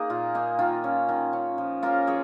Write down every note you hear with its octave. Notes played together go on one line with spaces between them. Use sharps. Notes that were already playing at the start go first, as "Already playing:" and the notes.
Already playing: A#3 D#4 G#4
A#2 F4
A#3 D#4
D#3 F4
C#4
D#3
C#4
F3
A#3 C#4 F4 A#4
F3 G#4 C#5